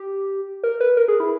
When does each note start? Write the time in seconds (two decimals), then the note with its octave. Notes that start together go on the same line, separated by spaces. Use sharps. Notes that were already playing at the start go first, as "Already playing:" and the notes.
Already playing: G4
0.64 A#4
0.80 B4
0.97 A#4
1.08 G#4
1.20 E4